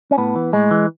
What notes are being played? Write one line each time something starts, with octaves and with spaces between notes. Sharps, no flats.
C#4
A2 B3
E3
A2 G#3
E3